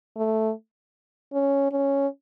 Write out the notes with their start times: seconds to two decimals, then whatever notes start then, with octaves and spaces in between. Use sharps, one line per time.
0.17 A3
1.33 C#4
1.72 C#4